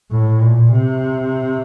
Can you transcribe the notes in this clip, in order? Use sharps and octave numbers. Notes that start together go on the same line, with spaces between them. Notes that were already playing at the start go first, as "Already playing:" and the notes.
A2
A#2
C3